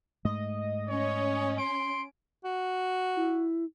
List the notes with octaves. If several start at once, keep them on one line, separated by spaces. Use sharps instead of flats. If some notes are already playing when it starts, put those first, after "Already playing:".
G#2 A3 D#5
C#4 C#5
C6 D7
F#4
E4